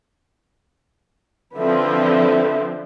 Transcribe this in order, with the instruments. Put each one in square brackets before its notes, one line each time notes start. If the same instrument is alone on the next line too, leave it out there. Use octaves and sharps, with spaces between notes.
[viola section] D3 F3 C4 [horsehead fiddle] B4 E5